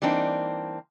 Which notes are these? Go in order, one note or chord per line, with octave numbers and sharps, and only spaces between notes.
E3 G3 A#3 C4 D4 D#4